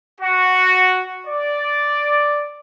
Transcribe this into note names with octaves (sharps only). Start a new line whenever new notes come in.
F#4
D5